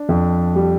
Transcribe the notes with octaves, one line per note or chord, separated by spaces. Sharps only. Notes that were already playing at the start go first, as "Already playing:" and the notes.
Already playing: D4
F2
G3